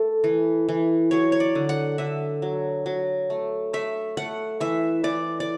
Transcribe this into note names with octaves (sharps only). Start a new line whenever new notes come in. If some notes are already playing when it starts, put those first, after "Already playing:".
Already playing: A3 A4
E3
E3
F#3 C#5
C#5
D5
D3
F#5
D3 E5
F#3
F#3
A3
A3 E5
A3 F#5
E3 E5
E3 D5
D5